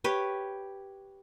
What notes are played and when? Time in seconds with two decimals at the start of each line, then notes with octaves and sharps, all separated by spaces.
0.04 G4 B4 C#5